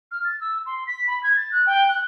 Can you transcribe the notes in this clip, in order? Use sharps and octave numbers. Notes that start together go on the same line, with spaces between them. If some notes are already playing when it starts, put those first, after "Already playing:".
F6
A6
E6
C6
B6
B5
G#6
A6
F#6
G5
F#6